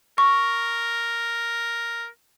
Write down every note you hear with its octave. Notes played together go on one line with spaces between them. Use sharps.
A#4 C#6